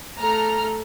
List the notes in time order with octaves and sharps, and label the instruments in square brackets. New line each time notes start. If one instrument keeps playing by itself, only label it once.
[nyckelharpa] A3 A4 [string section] A#5 F6